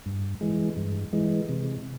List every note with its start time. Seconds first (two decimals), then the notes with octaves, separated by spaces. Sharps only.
0.06 G2
0.41 E3 G#3
0.76 G2
1.13 E3 G#3
1.49 C3